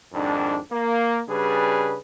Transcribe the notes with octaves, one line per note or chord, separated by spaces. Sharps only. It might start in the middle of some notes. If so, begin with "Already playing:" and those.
F2 G#2 D#3 D4
A#3
C#3 G3 D4 G#4 B4